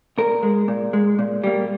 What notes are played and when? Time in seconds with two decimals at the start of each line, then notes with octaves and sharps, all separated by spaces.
0.18 A#2 A#4
0.43 G#3
0.68 A#2
0.93 G#3
1.19 A#2
1.44 G3 A#3